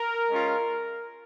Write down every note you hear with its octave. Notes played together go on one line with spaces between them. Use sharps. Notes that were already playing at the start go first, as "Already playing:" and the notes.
Already playing: A#4
G#3 C#4 F4